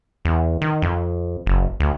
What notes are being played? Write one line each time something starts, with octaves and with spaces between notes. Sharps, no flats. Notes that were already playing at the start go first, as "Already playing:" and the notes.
E2
D#3
F2
F#1
D2